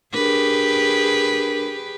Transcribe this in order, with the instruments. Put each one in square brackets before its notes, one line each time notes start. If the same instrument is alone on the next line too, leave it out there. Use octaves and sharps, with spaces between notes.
[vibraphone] D4 A#4 [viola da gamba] G4 G#4 B4